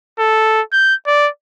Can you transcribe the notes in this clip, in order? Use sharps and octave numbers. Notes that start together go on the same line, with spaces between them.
A4
G6
D5